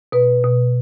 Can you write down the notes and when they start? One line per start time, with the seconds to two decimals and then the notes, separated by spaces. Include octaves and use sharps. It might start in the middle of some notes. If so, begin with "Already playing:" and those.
0.12 B2 B4
0.44 B2